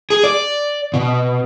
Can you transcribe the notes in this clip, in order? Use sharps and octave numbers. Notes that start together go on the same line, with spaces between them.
G#4
D5
B2